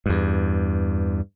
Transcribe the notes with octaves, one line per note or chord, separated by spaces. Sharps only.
E2 G2